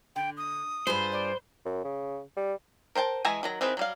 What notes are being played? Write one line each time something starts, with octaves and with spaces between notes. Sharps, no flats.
D3 G5
D#6
G2 F4 G#4 B4 C5
D5
F#2
C#3
G3
A#4 C5 G5 A5
E3 G#3 E5 G#5 A#5
D#3 F#3 A#5
D#3 C4 E4 G#4 B4
F#3 G3 F5